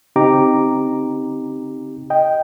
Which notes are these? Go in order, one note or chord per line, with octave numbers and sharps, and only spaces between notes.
C#3 C4 D#4 G4 A#5 D6
D#5 G5